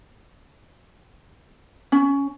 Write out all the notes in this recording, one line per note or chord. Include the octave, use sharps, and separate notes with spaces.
C#4